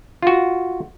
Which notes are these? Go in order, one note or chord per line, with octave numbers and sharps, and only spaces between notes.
F4 F#4